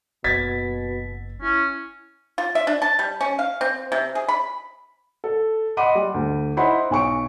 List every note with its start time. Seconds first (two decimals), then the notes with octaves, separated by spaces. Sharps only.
0.24 F#1 B2 G#6 A6 B6
1.42 C#4 E4
2.38 F4
2.55 E5
2.67 D4
2.82 A5
2.99 G3
3.21 C#4
3.39 F5
3.61 C4
3.92 C3
4.15 G#4
4.29 B5
5.24 A4
5.77 D#5 F#5 B5 C6 D6 D#7
5.95 G3
6.14 D2
6.57 D#4 E4 C5 F#5 B5 C6
6.91 B1 G#5 C#6 D7